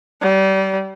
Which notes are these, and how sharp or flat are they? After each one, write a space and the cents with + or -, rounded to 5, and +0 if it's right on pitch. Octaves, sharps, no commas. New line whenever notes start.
G3 -30